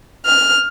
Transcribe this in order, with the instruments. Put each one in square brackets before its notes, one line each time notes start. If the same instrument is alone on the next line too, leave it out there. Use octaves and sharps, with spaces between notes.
[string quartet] F6